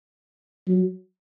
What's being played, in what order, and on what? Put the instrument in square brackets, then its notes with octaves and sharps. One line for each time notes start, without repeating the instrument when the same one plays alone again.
[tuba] F#3